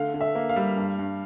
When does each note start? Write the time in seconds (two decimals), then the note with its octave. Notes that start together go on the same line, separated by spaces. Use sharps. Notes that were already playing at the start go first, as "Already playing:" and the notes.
Already playing: D3 A3 F5
0.14 D3
0.21 E5
0.35 A#3
0.49 F5
0.56 G3
0.77 G2
0.99 G2